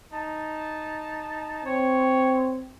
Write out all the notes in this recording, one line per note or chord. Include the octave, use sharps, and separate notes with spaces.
D#4 A5
C4 C#5